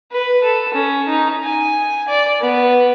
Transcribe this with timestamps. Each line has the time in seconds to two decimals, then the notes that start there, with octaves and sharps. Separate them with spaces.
0.13 B4
0.44 A4
0.74 C#4
1.08 D#4
1.43 G#5
2.08 D5
2.41 B3